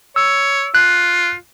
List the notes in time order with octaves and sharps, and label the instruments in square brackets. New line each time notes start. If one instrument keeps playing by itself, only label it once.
[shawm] C#5 [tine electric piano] E6
[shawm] F4 [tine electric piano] F#6